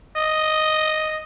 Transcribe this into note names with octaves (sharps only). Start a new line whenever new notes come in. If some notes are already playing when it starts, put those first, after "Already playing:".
D#5